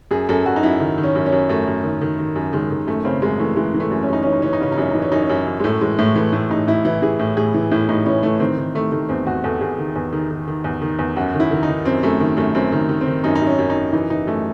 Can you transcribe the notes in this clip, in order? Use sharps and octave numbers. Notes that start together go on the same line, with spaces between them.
F#2 G#4
F#2 A4
F#2 F#4
D#4
F#2 E4
D#3
D#3
C#4
F#2
C#4
F#2
F#2 A3
F#2
D#3
D#3
D#3
F#2
D#3 G#3
D#3
F#2 A3
C#3 C4
F#2 G#3
E3 A3
E3 G#3
E3
A3
F#2
C#4
F#2 D#4
E3 C#4
D#4
E3 C#4
D#4
C#3 C#4
D#4
F#2 C#4
E3 D#4
C#4
F#2 D#4
C#4
F#2
F#2
G#3
A2 A3
E3 G#3
A2 A3
E3 A3
A2 A3
A2 D#4
A2 E4
E3 E4
E3 G#4
A2
A2 G#4
E3
A2 E4
A2 D#4
E3 C#4
E3 A3
D#3 C4
D#3
D#3 A3
D#3 A3
E2 C4
E2 F#4
E2 A4
E2 G#4
D#3
E2
D#3
D#3
D#3
E2
D#3
E2
F#2 F#4
D#3
E4
D#3
D#4
D#3
F#2 C4
F#2 A3
D#3
F#2 A3
F#2 C4
D#3
D#3
C4
D#3
F#2 D#4
D#4
F#2
C#4
F#2
D#4
F#2
E3 D#4
E3 D#4
F#2 A3